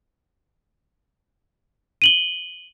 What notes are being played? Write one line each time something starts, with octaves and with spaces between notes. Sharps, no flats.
D#7 F#7 G7